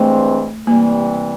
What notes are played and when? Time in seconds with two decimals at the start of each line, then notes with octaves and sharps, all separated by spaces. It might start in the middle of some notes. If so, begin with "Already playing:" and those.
Already playing: G2 E3 G#3 A3 C4
0.67 C3 E3 G3 A#3